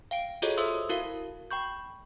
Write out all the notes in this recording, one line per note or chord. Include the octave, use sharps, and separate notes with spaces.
F5 G5 D7
F4 F#4 G#4 A4 C#5 D#5
A4 C5 E5 C6 D#6 E6
E4 F#4 A#4 F5
G5 B5 C#6 G6